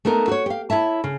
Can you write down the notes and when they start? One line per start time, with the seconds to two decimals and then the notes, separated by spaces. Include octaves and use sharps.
0.05 A3 B3 D#4 A#4
0.28 F#4 C#5
0.46 G4 F5
0.70 E4 C#5 E5 A5
1.04 C#3